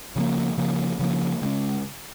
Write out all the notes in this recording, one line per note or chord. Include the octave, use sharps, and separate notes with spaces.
C#3 F3 A#3
C#3 F3 A#3
C#3 F3 A#3
C#3 G#3 C#4